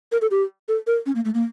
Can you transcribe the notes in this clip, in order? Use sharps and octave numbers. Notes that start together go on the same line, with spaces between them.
A#4
A4
G4
A4
A#4
C#4
A#3
A3
A#3